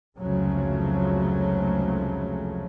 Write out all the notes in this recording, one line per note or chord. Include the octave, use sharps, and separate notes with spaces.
F1 C#2 C#3 F3 F#3 A3